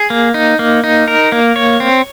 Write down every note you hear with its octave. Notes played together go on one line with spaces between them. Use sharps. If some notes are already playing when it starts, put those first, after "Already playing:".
Already playing: G#4
A#3
D#4
A#3
D#4
A#4
A#3
C#5
C4